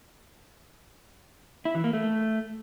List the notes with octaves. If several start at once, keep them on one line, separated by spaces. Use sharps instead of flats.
E4
E3
A#3
A3